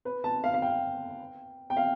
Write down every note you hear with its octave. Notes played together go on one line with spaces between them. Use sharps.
B4
A5
F5
F5
G5
G5
F5